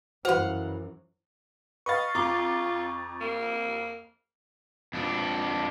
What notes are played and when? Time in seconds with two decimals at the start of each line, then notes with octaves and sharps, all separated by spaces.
0.25 F#2 E3 F#4 B4 C5 F5 F#5
1.86 B4 D#5 F5 C#6 A6
2.14 F2 F4 A#5 D6
3.20 A#3
4.94 F2 D4